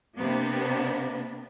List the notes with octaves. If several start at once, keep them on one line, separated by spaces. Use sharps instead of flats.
C3 A#3 B3 D4